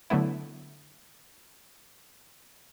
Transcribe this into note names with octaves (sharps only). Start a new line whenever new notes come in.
D3 F#3 A3 B3 E4